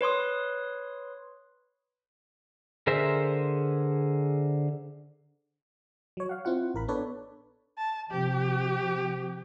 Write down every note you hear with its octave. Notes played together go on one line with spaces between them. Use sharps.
B4 C#5 C6 D#6
D3 G#4 A#4 C5 E5
F#3 C#5
F5 F#5
C4 E4 F4 F#5
A1 A#4 B5
B3 D4 A4 B4 C#5 D5
A5
C3 F3 G4